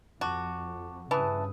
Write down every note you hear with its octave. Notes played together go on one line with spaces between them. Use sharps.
F2 F#4 A5 C#6 D6
G2 C#3 E3 B4 A5 D#6